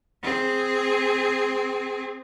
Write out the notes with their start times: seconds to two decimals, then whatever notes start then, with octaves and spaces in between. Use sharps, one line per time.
0.23 C4 G#4